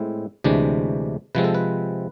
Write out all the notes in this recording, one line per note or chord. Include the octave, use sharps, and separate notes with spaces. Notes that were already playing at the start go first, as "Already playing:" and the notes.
Already playing: A2 G#3 C4 E4
D2 C3 E3 G#3 D4
C3 F3 G#3 C4 B4
A4
B4